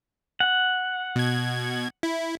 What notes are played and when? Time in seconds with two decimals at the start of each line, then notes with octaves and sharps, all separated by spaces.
0.40 F#5
1.16 B2 G#6
2.03 E4